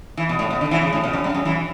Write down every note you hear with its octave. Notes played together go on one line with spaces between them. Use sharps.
E3
B2
A2
B2
D3
E3
C#3
A2
B2
F#2
G2
F#2
E3